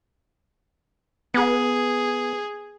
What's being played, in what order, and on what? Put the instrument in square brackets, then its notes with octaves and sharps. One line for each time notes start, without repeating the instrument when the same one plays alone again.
[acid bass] B3 [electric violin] G#4